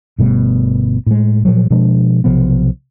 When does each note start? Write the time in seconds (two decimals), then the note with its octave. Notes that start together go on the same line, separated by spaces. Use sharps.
0.18 G1 B2 G3 A3
1.06 A2 G#3
1.45 A#2 F3 F#3
1.70 B2 F3 G#3 D4
2.24 B1 C3 F3 B3